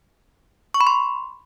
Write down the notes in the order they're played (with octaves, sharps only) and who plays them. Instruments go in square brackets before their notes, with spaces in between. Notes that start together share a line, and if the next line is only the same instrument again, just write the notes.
[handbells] C#6
B5
C6